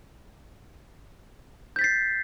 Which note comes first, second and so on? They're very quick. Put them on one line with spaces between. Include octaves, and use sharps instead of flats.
G6 B6 A6 C7